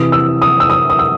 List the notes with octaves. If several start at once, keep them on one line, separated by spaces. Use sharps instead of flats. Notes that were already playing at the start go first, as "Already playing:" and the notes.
Already playing: C3 E3 D#6
E6
D#6
E6
D#6
D#6
E6